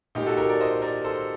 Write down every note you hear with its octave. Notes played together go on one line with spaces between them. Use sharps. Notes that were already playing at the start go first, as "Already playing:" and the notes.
A#2 D#4 G4
F#4 A4
G4 A#4
A#4 D5
C5 D#5
A#4 D5
A4 C5